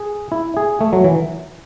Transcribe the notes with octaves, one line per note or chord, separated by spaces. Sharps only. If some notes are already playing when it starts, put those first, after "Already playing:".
Already playing: G#4
E4
G#4
A3
F#3
E3